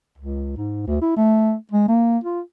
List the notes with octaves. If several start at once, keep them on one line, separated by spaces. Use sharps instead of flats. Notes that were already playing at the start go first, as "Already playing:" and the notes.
C#2
G#2
D2
E4
A3
G#3
A#3
F4